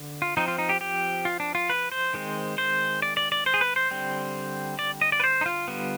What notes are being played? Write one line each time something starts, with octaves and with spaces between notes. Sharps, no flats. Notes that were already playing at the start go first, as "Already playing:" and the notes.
Already playing: D3
F4
F3 C4 D#4
F4
D#4
G4
G4
F4
D4
F4
B4
C5
D#3 G#3 C4
C5
D5
D5
D5
C5
G#4
B4
C5
D3 G3 C4
D5
D#5
D5
B4
C5
D#4
F4
D3 G3 B3